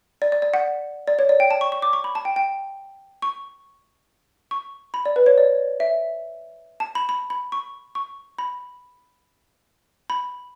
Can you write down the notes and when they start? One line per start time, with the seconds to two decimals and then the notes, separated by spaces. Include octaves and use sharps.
0.22 D5
0.32 D5
0.42 D5
0.54 F#5
1.07 D5
1.19 C#5
1.29 D5
1.40 G5
1.51 A5
1.61 C#6
1.72 C#6
1.82 D6
1.93 C#6
2.04 B5
2.15 A5
2.25 G5
2.36 G5
3.22 C#6
4.51 C#6
4.94 B5
5.06 D5
5.16 B4
5.26 C#5
5.38 D5
5.80 E5
6.80 A5
6.95 B5
7.09 B5
7.30 B5
7.52 C#6
7.95 C#6
8.38 B5
10.10 B5